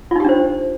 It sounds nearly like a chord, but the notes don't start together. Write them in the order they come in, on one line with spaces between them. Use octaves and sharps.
F4 D#4 G4 D4 C5